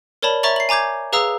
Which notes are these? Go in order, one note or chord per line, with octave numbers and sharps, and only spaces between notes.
A#4 C#5 D5 A5 B5
C#5 E5 A#5 C#6 A6 F#7
C7 F#7
G#5 A#5 D6 G6 G#6
G#4 B4 F5 A#5 D#6 E6